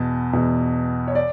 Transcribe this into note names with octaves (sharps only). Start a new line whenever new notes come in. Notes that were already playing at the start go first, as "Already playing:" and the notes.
Already playing: E2 B2 A5
E2 B2
C#5
D5